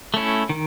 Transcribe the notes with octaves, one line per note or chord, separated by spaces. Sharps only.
A3 C#4 E4
D#3